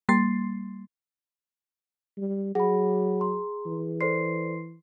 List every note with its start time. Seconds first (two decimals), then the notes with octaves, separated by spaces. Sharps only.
0.09 G3 A#3 C6 A6 C7
2.17 G3
2.55 F#3 G#4 F#5 B5
3.20 A#5 C6
3.66 E3
4.01 A4 C5 D5 C6 C7